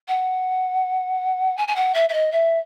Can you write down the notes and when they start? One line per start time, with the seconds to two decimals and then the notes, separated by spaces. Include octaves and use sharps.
0.08 F#5
1.57 G#5
1.68 G#5
1.76 F#5
1.94 E5
2.09 E5
2.13 D#5
2.32 E5